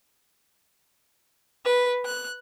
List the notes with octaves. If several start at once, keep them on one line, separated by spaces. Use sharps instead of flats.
B4
F#6